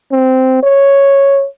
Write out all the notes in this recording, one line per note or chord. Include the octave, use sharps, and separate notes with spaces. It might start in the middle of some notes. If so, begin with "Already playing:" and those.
C4
C#5